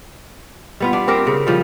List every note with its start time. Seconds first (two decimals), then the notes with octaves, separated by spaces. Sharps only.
0.80 G3 B3 F4
0.93 D4
1.08 C4 G4 A#4 C5
1.27 C#3
1.47 F3 G3